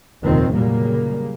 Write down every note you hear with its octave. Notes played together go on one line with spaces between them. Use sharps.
F1 D#2 A#2 D#3 F3 C4
A#2 C#3 F#3 G3 A#3